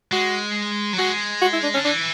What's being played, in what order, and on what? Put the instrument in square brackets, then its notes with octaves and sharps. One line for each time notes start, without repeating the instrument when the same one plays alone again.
[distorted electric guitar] G#3 [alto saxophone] F#4
[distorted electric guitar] F#3
[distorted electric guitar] G#3 [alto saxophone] F#4
[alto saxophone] F#4
E4
D4
[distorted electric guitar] D3 [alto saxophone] C#4
[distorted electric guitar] E3 [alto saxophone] D4